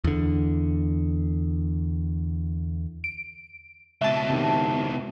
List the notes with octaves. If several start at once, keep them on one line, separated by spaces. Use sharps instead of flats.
E2 D3
D7
C#2 B2 E5 A5
C3 D#3